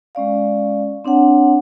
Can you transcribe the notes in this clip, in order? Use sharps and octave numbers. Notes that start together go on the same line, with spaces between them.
G#3 C#4 D5 F5
C4 D4 C#5 F#5 A5